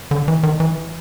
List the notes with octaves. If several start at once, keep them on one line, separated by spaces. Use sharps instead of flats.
D3
E3
D#3
E3